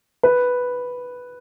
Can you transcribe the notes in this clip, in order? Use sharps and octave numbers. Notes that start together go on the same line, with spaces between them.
B4